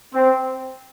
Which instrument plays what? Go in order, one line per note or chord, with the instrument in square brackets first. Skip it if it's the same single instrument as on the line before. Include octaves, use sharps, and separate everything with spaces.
[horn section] C4